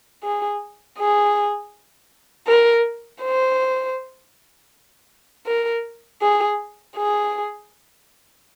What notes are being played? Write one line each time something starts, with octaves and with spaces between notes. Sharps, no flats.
G#4
G#4
A#4
C5
A#4
G#4
G#4